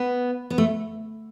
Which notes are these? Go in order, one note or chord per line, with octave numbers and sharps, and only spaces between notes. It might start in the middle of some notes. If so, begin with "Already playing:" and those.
Already playing: B3
B3
A3